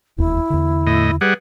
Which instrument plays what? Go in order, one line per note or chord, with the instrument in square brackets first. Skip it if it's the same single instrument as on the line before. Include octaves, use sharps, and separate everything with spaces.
[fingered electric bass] E1 D#2 [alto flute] E4
[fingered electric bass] E2 D3
[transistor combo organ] A2 D#5
[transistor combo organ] G3 G#4 F#5 [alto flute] B4